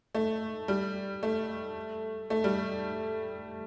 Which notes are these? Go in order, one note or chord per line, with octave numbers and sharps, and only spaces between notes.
A3
G3
A3
A3
G3